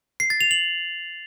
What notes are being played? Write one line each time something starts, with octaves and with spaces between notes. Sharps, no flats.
C7
A6
F7
F#7